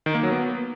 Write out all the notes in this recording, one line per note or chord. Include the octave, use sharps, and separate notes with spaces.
D#3
A#3
F#3
B3